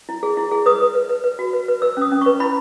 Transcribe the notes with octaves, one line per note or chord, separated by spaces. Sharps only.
E4
G#4
E4
G#4
B4 D#6
B4
B4
B4
B4
F#4
B4
B4
B4 E6
C#4 D#6
C#4
B4 C#6
E4 B5